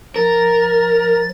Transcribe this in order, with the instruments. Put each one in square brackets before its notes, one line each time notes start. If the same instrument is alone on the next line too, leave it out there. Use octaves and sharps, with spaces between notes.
[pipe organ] F3 A6 [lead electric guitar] A#4